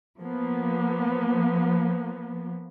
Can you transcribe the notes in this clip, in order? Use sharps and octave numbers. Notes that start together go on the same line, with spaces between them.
F3 A#3 B3